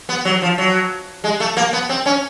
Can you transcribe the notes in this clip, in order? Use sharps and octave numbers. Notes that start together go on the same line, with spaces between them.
B3
F#3
F3
F#3
G#3
A3
A#3
B3
C4
C#4